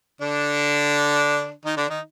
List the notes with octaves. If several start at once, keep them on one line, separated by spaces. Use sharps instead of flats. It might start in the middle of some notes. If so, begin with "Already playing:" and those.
D3 D4
D#3 D#4
D3 D4
D#3 D#4